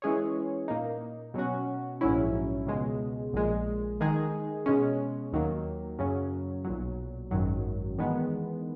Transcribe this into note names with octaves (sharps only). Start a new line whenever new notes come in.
E3 G#3 C#4 G#4 C#5
A#2 A#3 D#4
B2 F#3 C#4 F#4
A#1 G#2 F#3 C#4 E4
C#2 B2 G#3
A#1 A#2 G#3
D#3 G#3 D#4 G#4
B2 G#3 C#4
D#2 D#3 F#3 A#3
F#2 C#3 F#3 C#4
B1 A#2 F#3
G#1 F#2 D#3 F#3
E2 D#3 G#3 B3